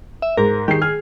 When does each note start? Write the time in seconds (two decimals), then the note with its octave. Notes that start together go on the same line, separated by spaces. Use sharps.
0.22 E5
0.37 G#2 A#4
0.68 D#3 G4 G#4 C7
0.82 G#4 F6